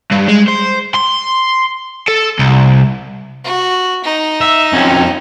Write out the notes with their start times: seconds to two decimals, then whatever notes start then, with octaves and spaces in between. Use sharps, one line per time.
0.11 G2
0.28 G#3
0.48 C5
0.94 C6
2.08 A4
2.39 C2
3.44 F#4
4.04 D#4
4.41 E5
4.73 F2 C#4